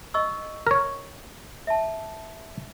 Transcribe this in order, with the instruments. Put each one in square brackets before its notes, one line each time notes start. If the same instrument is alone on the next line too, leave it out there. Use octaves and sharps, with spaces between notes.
[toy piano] D#5 C#6 E6
[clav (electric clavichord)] A#4 C#5
[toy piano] E5 A5